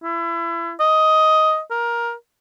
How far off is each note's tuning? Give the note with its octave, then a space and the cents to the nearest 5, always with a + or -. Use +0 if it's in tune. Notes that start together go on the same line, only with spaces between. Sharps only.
E4 +30
D#5 +10
A#4 +15